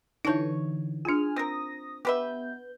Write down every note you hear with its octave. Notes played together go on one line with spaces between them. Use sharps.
D3 E3 D#4 F#4 C#5 A5 G6
D4 F4 G#4 G#5 F6
C4 A#4 D#6 A#6
B3 G4 B4 E5 G6